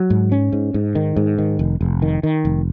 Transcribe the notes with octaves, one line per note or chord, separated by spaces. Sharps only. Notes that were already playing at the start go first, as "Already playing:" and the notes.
Already playing: F#3
G#2
C#4
G#2
G#2
D#3
G#2
D#3
F1
F1
D#3
D#3
F1